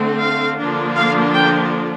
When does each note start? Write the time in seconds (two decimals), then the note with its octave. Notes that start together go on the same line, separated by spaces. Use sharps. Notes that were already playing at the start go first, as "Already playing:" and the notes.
Already playing: D3 A3 C4
0.23 F5
0.59 D3 F3 A#3 D4
0.97 F5
1.34 G5